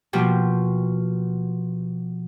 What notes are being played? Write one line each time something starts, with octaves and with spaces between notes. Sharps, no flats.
B2 F3 A#3 G4